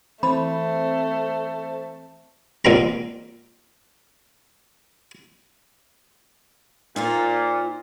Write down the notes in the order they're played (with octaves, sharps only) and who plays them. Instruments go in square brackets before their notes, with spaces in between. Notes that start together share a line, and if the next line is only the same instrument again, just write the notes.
[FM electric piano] E3 C4 C5 [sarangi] A3 [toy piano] B5
[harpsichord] A#2 C4 A#5
[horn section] A#2 [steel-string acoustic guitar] D#4 F4 C5